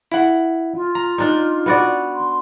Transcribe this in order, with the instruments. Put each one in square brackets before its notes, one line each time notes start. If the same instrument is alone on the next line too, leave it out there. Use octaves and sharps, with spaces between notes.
[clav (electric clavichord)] E4 F#5
[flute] F4
[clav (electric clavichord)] A#5
[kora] D4 D#4
B3 F#4 D5
[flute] C6